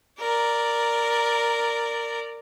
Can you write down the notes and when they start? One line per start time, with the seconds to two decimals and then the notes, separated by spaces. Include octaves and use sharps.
0.20 A#4 D5